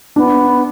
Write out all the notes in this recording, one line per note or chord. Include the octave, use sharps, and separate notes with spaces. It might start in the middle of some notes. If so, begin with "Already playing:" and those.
B3 D4